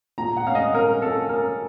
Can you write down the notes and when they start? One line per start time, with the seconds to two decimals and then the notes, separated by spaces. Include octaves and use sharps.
0.18 A#2 A#5
0.37 F#5
0.46 C#4 F5
0.55 D#5
0.74 C#4 A#4
1.01 C#4 A4
1.29 C#4 A#4